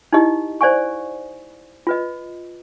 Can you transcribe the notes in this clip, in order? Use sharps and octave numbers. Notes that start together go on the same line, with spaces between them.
D#4 E4 G4 D#5
C5 D5 F5 G#5 C#6
F4 B4 D#5